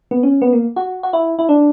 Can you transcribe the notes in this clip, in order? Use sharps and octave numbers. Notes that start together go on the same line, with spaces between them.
B3
C#4
B3
A#3
F#4
F#4
E4
E4
D4